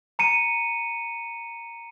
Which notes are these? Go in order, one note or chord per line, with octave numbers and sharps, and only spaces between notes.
A#5 C#7 D#7